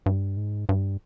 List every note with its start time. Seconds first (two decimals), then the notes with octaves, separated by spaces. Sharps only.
0.06 G2
0.37 G#2
0.69 G2